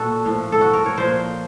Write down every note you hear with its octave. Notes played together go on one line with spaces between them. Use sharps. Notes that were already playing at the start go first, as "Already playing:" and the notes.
Already playing: A#2 F#4 A4
A2 F3
A4
F#4
A#4
C#5
A#2 F3 C5